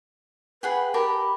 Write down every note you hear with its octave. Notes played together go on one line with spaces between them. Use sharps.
G#4 B4 F#5 G5
G4 A#4 A5 B5